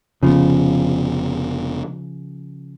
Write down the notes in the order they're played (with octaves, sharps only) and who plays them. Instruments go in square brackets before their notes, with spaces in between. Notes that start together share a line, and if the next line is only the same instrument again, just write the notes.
[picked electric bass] F1 B3 [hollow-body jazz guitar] C#3 F3